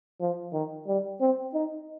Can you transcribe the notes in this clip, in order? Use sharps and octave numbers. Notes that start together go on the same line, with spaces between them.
F3
D#3
G3
C4
D#4